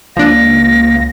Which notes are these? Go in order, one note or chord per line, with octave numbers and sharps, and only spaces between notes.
C#2 F3 A#3 D4 A#6